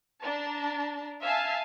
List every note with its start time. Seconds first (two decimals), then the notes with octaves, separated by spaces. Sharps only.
0.21 D4 A5 A#5
1.22 E5 F5 G#5 A5